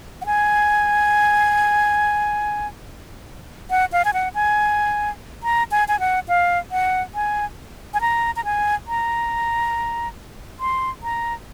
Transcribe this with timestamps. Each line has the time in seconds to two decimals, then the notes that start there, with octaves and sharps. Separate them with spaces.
0.21 F#5
0.26 G#5
3.70 F#5
3.92 F5
4.05 G#5
4.14 F#5
4.35 G#5
5.43 A#5
5.71 G#5
5.88 G#5
6.00 F#5
6.28 F5
6.72 F#5
7.15 G#5
7.94 G#5
8.01 A#5
8.36 A#5
8.45 G#5
8.88 A#5
10.60 C6
11.03 A#5